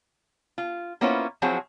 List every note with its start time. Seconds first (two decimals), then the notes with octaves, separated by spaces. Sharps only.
0.58 F4
1.01 A#3 B3 C#4 E4 F4 C5
1.42 F3 F#3 C4 E4 F#4 G#4